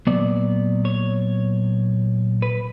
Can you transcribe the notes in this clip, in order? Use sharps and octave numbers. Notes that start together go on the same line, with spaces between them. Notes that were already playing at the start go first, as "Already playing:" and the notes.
A#2 F#3 B3 D5
C#5
B4